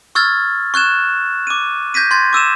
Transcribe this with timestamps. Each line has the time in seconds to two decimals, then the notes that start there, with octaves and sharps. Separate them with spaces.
0.15 C#6 E6 F6 G#6 A6
0.74 C#6 F#6 G#6 E7
1.47 D6 D#7
1.94 G6 G#6 A#6 B6 D#7
2.11 C6 G#6 A6
2.33 D6 E6 D#7 E7